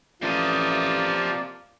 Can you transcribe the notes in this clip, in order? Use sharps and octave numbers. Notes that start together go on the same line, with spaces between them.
A1 C3 F3 A#3 D5 D#5